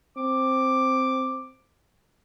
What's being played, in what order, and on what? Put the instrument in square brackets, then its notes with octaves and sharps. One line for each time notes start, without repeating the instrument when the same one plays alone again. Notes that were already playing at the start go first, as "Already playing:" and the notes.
[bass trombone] C4 [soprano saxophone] D6